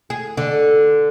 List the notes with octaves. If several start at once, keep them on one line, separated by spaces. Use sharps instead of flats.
G#4
D3